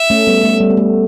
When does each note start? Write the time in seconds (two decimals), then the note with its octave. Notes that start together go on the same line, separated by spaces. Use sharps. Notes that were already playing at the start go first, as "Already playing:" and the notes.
Already playing: E5
0.10 A3 C#4
0.27 G3 B3
0.43 A3
0.60 G3
0.70 B3
0.77 A3